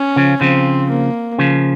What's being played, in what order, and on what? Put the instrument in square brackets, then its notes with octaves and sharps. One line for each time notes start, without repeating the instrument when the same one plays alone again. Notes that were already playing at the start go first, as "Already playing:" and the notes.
Already playing: [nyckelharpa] C#4
[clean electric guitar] C#3 F3
[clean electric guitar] C#3 F3 [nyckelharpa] C4
[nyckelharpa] A#3
[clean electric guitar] C#3 F3